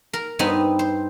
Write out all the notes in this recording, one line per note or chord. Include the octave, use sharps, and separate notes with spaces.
A#4
G2 B3 C4 D#4
C5